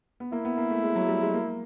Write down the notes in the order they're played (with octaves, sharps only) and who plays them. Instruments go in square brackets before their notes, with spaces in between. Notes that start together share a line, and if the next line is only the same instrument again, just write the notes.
[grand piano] B3
[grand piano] A#3 [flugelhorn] E4
[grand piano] B3
A#3
A3
G#3
F#3
G3
G#3
A#3